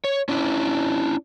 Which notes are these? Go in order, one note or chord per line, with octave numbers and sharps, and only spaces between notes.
C#5
C#4 D4 E4 D5